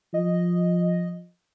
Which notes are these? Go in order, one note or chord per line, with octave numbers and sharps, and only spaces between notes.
F3 D#5